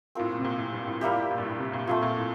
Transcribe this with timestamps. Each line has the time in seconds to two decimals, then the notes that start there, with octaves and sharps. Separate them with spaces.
0.15 A2 C4 F4 A#4
0.30 A#2
0.39 C3
0.45 A#2
0.58 A2
0.73 G2
0.87 A2
1.01 A2 G3 A#3 E4 G4
1.16 A2
1.31 A#2
1.38 G2
1.45 A2
1.60 C3
1.73 A#2
1.87 A#2 A3 C4 F4
2.02 A#2
2.16 A2